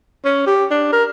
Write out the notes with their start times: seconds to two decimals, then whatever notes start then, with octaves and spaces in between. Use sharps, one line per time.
0.25 C#4
0.47 G4
0.71 D4
0.93 A#4